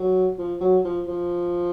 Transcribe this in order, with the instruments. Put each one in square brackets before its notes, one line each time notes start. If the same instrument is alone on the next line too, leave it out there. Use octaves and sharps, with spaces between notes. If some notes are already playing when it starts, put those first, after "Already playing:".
Already playing: [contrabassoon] F#3
F3
F#3
F3
F3